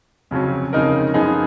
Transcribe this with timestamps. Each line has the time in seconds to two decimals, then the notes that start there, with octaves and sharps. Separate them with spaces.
0.31 F2 C#3 F#3 C#4
0.73 F2 C#3 G#3 D#4 A#4
1.14 F#2 F3 B3 D#4 G#4